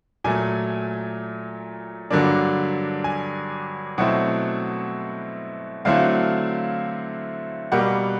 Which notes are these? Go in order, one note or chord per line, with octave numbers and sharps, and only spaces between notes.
A#2 F#3 A3 G#5
G2 D3 F#3 A#3 D4
G#5
B2 F#3 A3 C4 E4 F#5
D3 F#3 A3 C4 E4 F5
B2 G3 A#3 F#5